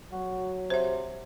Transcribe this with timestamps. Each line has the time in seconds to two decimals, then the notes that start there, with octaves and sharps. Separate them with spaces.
0.12 F#3 F#4
0.70 C3 C5 E5